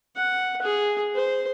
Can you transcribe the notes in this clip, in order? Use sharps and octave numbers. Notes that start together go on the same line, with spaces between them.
F#5
G#4
C5